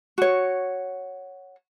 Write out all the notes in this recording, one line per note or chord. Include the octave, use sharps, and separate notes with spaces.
F#4 C#5